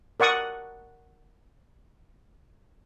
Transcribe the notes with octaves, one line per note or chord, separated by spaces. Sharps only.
A#4 D5 F#5 C#6 D#6